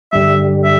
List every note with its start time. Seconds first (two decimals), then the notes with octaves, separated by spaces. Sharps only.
0.13 G2 D3 G3 E5
0.64 E5